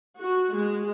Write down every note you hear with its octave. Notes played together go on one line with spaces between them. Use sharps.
F#4
G#3